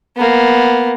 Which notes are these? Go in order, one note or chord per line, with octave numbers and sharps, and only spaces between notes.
A#3 B3